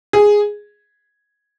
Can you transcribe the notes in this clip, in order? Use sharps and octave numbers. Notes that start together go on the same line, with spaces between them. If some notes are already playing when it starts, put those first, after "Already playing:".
G#4